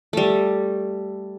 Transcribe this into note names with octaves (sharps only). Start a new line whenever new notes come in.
G3 A3